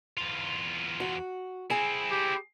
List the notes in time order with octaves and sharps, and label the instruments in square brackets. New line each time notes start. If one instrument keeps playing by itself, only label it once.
[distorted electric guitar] E2 F4
[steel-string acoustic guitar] F#4
[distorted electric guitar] C4 E4 [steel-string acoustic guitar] G#4 G#5
[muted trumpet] G4